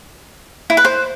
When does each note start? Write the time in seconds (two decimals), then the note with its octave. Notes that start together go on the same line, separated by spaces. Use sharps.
0.70 E4
0.77 B4
0.85 C5